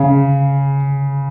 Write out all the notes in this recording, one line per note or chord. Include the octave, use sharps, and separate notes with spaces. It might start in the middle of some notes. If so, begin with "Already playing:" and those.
Already playing: C#3